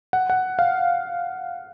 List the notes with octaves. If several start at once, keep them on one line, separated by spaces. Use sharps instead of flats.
F#5
F#5
F5